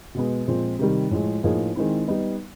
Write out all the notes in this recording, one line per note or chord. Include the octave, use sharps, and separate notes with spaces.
B2 G#3 B3
A#2 F3 G#3 C4
C3 D#3 G3
A2 F3 G#3
A2 F3 A#3 D#4 G#4
D#3 G#3 C4 E4
G3 B3 D#4